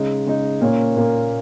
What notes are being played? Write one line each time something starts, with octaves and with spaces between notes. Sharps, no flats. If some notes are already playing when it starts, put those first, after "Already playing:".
Already playing: C#3 G#3 D#4
C#3 G#3 D#4
A#2 A#3 C#4
A#2 A#3 C#4